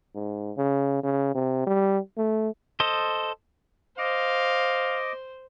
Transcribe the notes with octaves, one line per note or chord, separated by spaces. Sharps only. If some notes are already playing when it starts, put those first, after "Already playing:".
G#2
C#3
C#3
C3
G3
A3
A4 C5 D#5
C5 D#5 F5 D6